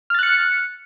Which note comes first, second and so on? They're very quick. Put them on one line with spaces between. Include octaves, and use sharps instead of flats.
F6 A6 F#6 C#7